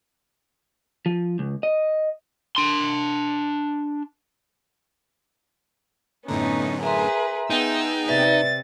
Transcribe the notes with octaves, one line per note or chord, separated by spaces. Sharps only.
F3
C#2
D#5
D4 C6
F#2 A2 D3 B3 C#4 D#4 A#5
G#4 A#4 B4 E5 A#5 C6
B3 D#4 G#4 G5 E6
C3 B4 D5 E5 A6